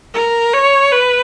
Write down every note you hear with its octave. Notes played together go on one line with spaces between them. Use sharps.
A#4
C#5
B4